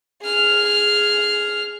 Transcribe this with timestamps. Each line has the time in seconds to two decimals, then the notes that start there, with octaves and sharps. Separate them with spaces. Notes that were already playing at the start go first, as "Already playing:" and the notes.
0.22 G#4 F6